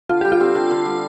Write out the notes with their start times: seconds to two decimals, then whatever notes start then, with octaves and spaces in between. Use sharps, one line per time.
0.09 D3 F4
0.21 G3 G4
0.32 F4
0.40 C4
0.55 D3
0.71 D3
0.86 G3